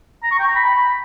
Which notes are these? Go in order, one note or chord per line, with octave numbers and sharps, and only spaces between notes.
A#5
C#6
G5
A#5
B5